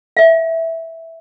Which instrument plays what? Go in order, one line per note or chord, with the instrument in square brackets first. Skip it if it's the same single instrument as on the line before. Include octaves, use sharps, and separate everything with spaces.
[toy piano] E5 F5